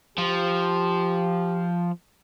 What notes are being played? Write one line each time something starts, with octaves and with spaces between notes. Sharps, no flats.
F3 G4